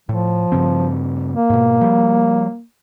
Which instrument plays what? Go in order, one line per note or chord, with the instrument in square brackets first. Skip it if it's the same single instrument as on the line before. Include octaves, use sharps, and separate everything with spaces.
[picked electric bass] A2 [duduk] F3
[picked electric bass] G2 C#3 C4
[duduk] A#3
[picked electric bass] G#2 B2
F3 G3